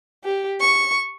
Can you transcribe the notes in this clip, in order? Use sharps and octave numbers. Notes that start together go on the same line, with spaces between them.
G4
C#6